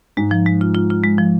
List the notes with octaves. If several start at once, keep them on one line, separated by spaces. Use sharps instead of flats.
G#2 G#3
F3
G#3
F4
F4
F4
G#3
F3